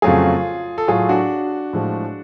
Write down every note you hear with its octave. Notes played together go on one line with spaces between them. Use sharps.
F2 C#3 F#3 A3 F4 G#4
A4
A2 F#3 A3 F4 G#4
D4 F#4
A2 F3 G#3